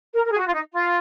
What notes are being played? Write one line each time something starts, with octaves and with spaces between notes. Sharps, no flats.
A#4
A#4
G#4
F#4
F4
D#4
F4